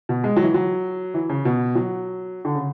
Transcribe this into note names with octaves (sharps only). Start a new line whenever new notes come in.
B2
G#3
F#3
E3
F#3
E3
C#3
B2
F#3
D3
C#3